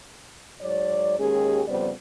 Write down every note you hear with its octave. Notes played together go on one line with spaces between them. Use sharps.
G#2 F#3 C#5 D5
D#2 G#3 C#4 G4 G#4
F2 C#3 G3 B3 C5 D5